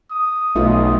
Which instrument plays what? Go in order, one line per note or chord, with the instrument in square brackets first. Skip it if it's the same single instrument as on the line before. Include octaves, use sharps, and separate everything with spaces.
[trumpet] D#6
[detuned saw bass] B1 [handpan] A3 D#4 F4